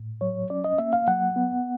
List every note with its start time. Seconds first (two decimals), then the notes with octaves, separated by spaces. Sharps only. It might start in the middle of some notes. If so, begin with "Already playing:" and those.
Already playing: A2
0.21 F#3 C#5
0.50 C#4 D5
0.64 D#5
0.78 A#3 E5
0.93 F5
1.08 F#3 F#5
1.36 B3